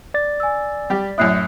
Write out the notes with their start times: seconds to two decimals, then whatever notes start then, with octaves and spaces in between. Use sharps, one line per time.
0.14 D5 A6
0.40 G#5 E6
0.90 G3 G4
1.18 F#2 A2 E4 D#6 F#6 C7